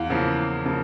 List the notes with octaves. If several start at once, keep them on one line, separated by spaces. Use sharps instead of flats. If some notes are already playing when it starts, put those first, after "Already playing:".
Already playing: E2 F5
C#3 F3 A#3
E2
C#3 F3 A#3